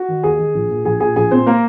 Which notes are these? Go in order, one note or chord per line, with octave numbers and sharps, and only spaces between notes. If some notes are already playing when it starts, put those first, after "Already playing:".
Already playing: F#4
D#3
D#2 G#4 G#5
D#3
A#1
A#2
A#1 G#4 G#5
A#2 G#4 G#5
A#1 G#4 G#5
A#2 C4 C5
A#3 A#4